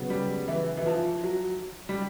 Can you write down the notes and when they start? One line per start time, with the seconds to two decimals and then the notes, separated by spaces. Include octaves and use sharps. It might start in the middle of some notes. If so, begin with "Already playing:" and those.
Already playing: C#3 F#3 B3
0.10 G3
0.48 E3
0.77 E3
0.86 F3
1.23 F#3
1.89 G3